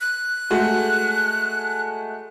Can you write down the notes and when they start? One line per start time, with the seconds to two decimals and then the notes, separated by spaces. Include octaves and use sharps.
0.01 F#6
0.50 G#3 A3 F#4